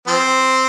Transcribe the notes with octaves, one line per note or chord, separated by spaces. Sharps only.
F3 C4